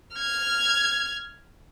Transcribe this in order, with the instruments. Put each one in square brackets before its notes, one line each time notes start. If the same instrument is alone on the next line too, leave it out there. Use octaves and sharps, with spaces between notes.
[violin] F6 G#6